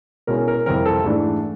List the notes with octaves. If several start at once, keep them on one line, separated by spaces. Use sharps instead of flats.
B2 G#3 C#4 E4 A#4
A#4
F2 C3 E3 G3 C4 A#4
A4
G#2 E3 A3 D4